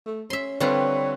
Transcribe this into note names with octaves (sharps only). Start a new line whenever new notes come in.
A3
C#4 E5 C6
D3 G3 C4 F4 B4 C#5 F#5